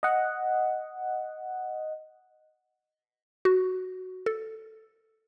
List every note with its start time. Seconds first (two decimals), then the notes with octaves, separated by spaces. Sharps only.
0.03 D#5 F#5
3.45 F#4
4.26 A4